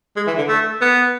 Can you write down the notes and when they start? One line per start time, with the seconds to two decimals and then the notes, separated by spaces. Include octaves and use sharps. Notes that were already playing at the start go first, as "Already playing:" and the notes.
0.16 G#3
0.27 E3
0.38 D3
0.48 A3
0.81 B3